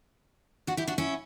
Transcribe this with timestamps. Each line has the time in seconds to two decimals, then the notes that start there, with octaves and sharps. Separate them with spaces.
0.67 D4 F#4
0.77 E4 G4
0.88 D4 F#4
0.98 C#4 E4